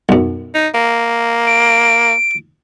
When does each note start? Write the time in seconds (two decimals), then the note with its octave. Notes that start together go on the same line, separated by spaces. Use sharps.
0.09 B1 F#2
0.54 D#4
0.74 A#3
1.46 D7